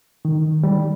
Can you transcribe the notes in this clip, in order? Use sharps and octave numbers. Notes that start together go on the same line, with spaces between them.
D#3
G3